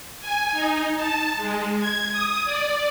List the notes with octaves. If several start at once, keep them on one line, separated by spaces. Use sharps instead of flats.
G#5
D#4
A5
G#3
G#6
D#6
D5